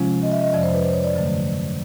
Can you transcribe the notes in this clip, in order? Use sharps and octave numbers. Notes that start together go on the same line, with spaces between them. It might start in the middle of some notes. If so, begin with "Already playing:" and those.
Already playing: C3 F3 G#3 C#4 F4
D#5
E5
D#5
F2 C3 F3 D5
C5
B4
C5
C#5
D5
G2 D3 F#3 A3